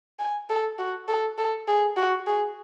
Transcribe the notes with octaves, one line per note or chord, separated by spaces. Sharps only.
G#5
A4
F#4
A4
A4
G#4
F#4
G#4